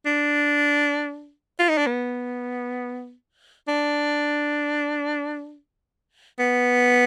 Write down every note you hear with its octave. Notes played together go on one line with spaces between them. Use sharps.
D4
F4
D#4
D4
B3
D4
B3